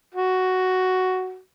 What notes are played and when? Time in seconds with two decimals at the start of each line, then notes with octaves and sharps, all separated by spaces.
0.14 F#4